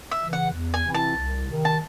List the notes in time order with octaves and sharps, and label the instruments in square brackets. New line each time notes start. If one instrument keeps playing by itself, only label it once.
[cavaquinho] E5
[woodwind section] C#3 E3
[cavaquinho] F#5
[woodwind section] E2
[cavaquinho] G#5
[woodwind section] C3 E3 C4 E4
[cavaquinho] A5
[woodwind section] C2
C3
D#3
[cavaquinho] A5